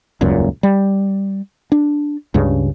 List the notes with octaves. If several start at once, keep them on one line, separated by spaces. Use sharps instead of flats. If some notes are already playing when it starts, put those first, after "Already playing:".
D#1 C#2 F#2 A#2
G3
D4
C#2 G2 C#3